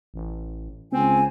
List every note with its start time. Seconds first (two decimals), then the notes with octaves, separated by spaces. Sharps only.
0.14 A1
0.92 C#2 C4 G#5